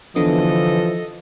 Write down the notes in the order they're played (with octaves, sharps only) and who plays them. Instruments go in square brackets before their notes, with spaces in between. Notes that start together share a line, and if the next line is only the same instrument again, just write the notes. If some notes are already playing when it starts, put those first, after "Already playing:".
[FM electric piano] D3 B3 [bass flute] E3 [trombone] F3 [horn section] A4 D#5